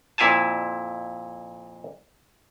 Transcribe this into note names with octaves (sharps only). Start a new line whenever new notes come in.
F2 A#2 E4 F5 G#5 A5